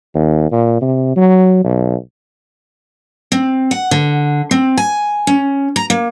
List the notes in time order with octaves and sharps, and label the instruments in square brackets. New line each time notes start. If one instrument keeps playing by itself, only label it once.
[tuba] D#2
A#2
C3
F#3
B1
[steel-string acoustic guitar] C4
F#5
D3
C4
G#5
C#4
A#5
A#3